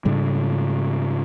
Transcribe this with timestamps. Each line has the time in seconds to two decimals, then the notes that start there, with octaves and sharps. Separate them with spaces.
0.05 G#2 C#3 G3